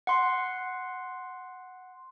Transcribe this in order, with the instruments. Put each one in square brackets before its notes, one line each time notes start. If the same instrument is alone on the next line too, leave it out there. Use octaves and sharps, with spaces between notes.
[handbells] F#5 C6